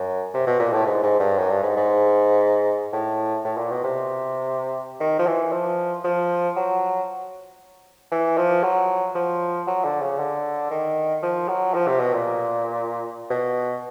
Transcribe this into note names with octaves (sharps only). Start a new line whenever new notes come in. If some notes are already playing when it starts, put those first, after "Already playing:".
Already playing: F#2
C3
B2
A#2
A2
G#2
G#2
G2
F#2
G2
G#2
G#2
A2
A2
A#2
B2
C3
D#3
F3
E3
F3
F3
F#3
E3
F3
F#3
F3
F#3
D3
C#3
D3
D#3
F3
F#3
F3
C3
B2
A#2
B2